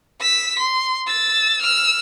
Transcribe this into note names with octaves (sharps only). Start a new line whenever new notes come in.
E6 B6
C6
E6 A6
E6 F6